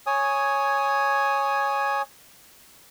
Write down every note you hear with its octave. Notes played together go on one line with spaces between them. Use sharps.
C#5 G#5 D#6